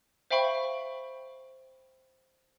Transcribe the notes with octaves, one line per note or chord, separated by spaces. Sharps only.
C5 E5 F5 G5 B5 C#6